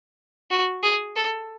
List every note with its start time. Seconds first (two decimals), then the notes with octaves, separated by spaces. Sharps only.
0.51 F#4
0.83 G#4
1.16 A4